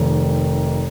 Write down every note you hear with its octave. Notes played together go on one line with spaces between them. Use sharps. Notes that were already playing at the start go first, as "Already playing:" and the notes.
Already playing: F1 D#3